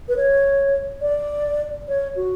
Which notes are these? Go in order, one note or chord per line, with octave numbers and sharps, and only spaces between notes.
B4
C#5
D5
C#5
F#4